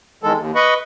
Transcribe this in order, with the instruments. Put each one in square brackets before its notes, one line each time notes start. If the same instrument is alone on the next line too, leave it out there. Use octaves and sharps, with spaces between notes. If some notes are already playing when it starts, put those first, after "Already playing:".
[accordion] E2 D#3 G#3 A4
D#2
B4 D#5 B5 C#6